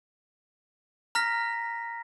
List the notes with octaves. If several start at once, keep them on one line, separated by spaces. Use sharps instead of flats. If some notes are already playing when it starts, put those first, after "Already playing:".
A#5 F6 A#6 B6